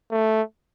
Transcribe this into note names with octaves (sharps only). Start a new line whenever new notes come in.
A3